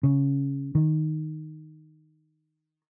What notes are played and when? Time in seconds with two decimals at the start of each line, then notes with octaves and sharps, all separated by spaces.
0.03 C#3
0.75 D#3